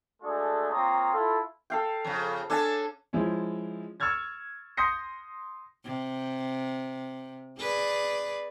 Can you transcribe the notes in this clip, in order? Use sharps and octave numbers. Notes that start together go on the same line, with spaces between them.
G#3 A3 D4 F#4 G#4 A4
A#3 C4 F4 C#5 A#5 D#6
E4 F4 A4
A4 F5 G5
F2 C#3
C#4 D4 A4 G#5 A5
F3 G#3 C#4 E4
C#6 E6 F6 G#6 A6
C6 D#6 G6 A#6 C7 C#7
C3
G#4 B4 D5